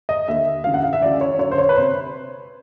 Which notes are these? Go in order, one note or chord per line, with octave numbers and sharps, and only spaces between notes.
D#5
D#2 D3 E5
D2 C#3 E3 F5
F#5
F5
E5
D2 C#3 E3 D5
C#5
F#2 D3 C#5
C5
C#5
B4
C3 C5